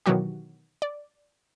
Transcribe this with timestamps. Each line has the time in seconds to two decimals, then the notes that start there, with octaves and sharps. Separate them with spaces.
0.06 B2 D#3 E3 F#3 F#4 G4
0.82 D5